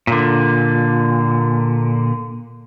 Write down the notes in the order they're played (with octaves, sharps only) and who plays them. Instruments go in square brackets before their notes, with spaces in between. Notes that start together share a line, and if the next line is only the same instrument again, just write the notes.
[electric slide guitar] A#2 D3